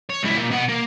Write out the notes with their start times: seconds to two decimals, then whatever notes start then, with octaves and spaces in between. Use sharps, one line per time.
0.10 C#5
0.23 C#2 E4
0.37 A#2
0.51 B2 F#5
0.69 A#3